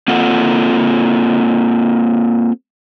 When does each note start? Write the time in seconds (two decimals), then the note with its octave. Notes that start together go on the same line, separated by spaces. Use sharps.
0.08 A#3 C4 F4 A4 F#5